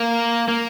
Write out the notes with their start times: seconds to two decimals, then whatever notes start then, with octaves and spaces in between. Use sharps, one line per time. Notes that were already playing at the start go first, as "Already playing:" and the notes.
Already playing: A#3
0.48 A#3